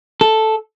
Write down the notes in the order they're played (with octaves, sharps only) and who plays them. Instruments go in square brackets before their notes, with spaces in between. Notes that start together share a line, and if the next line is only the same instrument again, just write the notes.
[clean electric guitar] A4